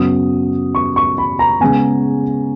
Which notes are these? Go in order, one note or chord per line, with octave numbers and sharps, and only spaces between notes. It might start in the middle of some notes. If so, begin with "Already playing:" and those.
Already playing: F#2 C#3 F#3 B3 D#6
C#6
C#6
B5
A#5
C#3 G#3 B3 G#5